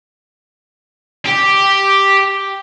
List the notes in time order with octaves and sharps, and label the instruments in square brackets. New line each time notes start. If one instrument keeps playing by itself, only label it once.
[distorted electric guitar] G4